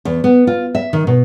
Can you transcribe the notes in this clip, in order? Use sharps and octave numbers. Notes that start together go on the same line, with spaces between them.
E2
B3
F4
E5
D#3
B2